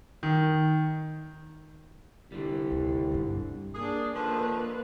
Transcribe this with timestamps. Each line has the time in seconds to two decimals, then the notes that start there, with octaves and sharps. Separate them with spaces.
0.23 D#3
2.32 C2 D3 G3
2.71 D2 C3
3.11 B1 G2
3.75 A#3 D4 G#4
4.15 D3 D#3 F3 A#3 B4